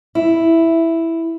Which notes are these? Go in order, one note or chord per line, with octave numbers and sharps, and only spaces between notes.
E4